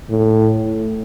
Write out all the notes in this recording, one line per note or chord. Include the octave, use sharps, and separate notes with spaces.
A2